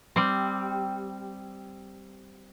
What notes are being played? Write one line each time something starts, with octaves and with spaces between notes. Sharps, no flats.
G3 C4